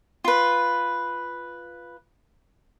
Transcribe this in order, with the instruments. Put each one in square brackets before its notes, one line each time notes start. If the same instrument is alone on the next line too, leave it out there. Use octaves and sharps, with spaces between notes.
[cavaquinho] F4 B4